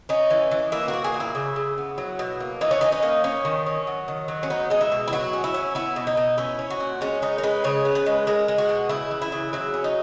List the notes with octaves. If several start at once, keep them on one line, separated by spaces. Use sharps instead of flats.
C#4 D#4
E3
E3
A#3 E4
F#4
A#3
G#4
A#2
E4
C#3
C#3
B3
F#3
B2
A#3
E3 D#4
C#4
C#4 D#4
D#4
A#3
C#4
D#3
C#4
F#3
D#3
F#3
C#4
B3 D#4
G#3 D#4
E4
B2
E4
F#3 F#4
C#4
E4
C#4
B3 E4
B2
D#4
B2
C#4 E4
C#4
F#4
A#2
G#3 C#4
C#4 D#4
A#4
G#3 B4
C#3 C#5
B3
B4
G#3
G#3 A#4
G#3
F#4
B2
C#3 E4
E3
E4
C#3
F#3 E4
C#4
D#4